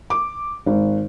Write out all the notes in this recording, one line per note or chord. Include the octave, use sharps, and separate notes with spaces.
D6
G#1